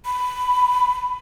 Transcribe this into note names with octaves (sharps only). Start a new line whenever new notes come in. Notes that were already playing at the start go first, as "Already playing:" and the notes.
B5